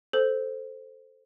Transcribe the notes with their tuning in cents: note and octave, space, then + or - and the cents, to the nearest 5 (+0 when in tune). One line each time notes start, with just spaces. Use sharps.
A4 +0 C5 +0